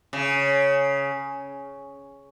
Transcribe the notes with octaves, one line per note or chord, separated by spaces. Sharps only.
C#3